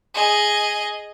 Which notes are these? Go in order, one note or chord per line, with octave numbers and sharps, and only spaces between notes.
G#4 D#5